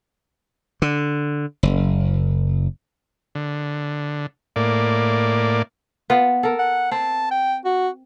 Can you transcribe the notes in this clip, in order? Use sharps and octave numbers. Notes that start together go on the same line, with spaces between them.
D3
F#1
D3
A2 A#3 D5
B3 F4 B4
A4 A#4
F#5
C4 A5
G5
F#4